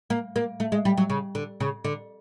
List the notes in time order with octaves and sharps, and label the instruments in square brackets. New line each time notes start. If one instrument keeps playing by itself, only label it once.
[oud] A#3
A#3
A3
G#3
G3
F#3
C#3
D3
C#3
D3